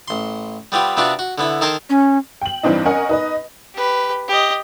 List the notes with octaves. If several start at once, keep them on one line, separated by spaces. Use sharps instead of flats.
A1 C6
G3 B3 C4 F4 G4
C3 B3 C4 D4 F4 F#4
F#4
D3 B3 E4 E5
D#3 A4 A#4 C5 G#5 A5
C#4
G5 F#7
G2 E3 C4 D4 D#4
C#4 A#4 D#5 F#5 G#5
D#4 B4 D#5
G4 B4
G4 D#5